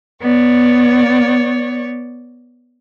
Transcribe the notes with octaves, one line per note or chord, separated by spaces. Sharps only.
B3 C#5 D5